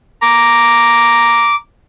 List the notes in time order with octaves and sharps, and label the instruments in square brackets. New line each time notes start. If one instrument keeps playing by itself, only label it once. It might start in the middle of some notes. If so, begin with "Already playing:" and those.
[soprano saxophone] A#5 [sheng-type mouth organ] D6